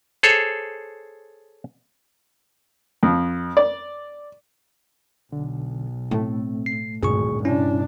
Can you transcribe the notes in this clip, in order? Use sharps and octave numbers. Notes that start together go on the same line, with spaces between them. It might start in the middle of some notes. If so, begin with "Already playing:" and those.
G#4 A4 C5 C#5
F2
D5
B1 D3
A2 A3 C4
C7
G#1 D2 G2 A#2 G#4 C#6
C3 C#4 D4 E4